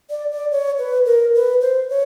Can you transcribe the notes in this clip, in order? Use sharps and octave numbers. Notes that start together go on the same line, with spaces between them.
D5
D5
C#5
B4
A#4
B4
C5
C#5